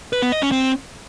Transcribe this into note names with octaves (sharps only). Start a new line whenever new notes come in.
B4
B3
D#5
C#4
C4